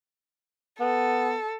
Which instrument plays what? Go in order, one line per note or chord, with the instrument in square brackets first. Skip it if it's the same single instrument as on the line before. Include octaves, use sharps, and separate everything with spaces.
[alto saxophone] B3 [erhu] A4